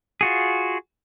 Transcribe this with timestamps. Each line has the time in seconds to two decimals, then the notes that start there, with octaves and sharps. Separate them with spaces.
0.21 F4 F#4 G#4